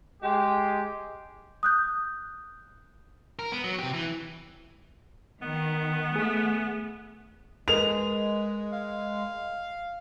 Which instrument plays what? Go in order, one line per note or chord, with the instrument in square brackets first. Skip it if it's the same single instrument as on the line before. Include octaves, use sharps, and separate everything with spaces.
[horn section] G#3 G4
[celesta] D#6 F#6 G6
[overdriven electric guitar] A#4
B3
F#3
C3 G4
E3
[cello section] D#3 [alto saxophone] B3
[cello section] A3 [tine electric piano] G#4
[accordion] G#3 [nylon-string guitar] G#4 A#4 B4 [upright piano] F7
[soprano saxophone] F5